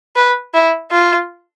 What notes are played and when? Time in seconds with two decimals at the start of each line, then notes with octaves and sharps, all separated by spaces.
0.16 B4
0.54 E4
0.91 F4